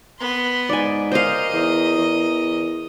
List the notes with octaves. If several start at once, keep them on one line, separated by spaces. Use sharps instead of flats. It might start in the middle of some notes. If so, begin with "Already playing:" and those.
B3 C6
G#2 D5 G#5
A#4 C5 D#5 F5
E2
E2